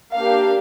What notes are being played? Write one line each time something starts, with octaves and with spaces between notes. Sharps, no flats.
A#3 D4 G4 F5